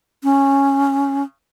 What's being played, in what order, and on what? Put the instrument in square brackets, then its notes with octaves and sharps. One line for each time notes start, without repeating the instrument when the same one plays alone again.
[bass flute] C#4